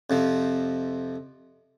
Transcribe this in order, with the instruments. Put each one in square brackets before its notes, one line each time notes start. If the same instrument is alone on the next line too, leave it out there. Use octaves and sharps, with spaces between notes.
[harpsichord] F2 C3 F3